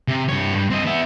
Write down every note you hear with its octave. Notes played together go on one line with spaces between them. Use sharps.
C3
G2 C#5
G2
C4 D#5
B3 E5